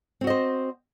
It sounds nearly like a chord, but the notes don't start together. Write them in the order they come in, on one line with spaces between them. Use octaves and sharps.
C4 F#4 D#5 C5